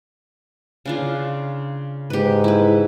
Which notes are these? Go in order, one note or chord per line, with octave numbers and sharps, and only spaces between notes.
C#3 D4 F4
G#2 G4 B4
E4 B4